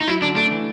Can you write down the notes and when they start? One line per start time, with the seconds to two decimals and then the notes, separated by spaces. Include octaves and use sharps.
0.01 D#4
0.08 F#3 E4
0.21 D3 D4
0.36 A3 D4
0.52 E3